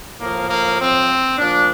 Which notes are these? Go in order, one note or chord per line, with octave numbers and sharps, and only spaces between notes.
A2 F3 A#3
A#3
C4
A#2 F3 D4